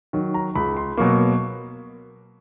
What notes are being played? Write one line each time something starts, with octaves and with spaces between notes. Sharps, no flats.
D#3 F#3
A#5
C#2 B5
C6
B2 F#3 A#3 C#6